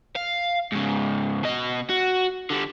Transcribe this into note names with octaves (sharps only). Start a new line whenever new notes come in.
F5
G#2 C#3
B2 D#5
F#4
D3 G3